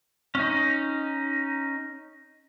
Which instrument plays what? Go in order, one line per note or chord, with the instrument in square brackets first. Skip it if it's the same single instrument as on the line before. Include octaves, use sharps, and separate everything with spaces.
[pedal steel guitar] C#4 D#4